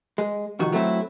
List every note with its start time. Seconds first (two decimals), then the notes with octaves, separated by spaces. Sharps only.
0.18 G#3
0.59 C2 F2 D#3 F#4
0.72 F#3 A3 C4 E4